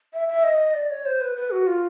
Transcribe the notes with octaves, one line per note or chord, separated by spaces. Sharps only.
E5
E5
D#5
D5
C#5
C5
B4
B4
F#4
F4